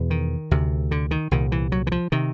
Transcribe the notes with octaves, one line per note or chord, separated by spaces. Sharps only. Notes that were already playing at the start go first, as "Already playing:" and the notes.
Already playing: E2 B2
D#3
D2 C3
D3
D#3
C2 A#2 D#3
E3
F#3
E3
F3
C3 D#3